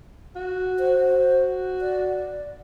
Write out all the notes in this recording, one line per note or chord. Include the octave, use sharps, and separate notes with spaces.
F#4
C5
F#4
D5